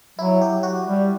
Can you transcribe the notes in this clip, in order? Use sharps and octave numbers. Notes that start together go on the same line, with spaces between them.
F#3 E4
G4
F#4
G3